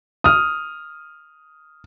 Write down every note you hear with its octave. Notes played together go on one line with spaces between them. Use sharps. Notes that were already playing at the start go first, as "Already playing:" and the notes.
D#6 F6